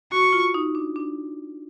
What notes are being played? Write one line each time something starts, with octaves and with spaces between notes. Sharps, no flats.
F#4 C#6
F4
D#4
D4
D4